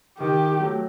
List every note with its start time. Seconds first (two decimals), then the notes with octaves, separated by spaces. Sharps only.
0.19 D#3 G4
0.60 F#3 A3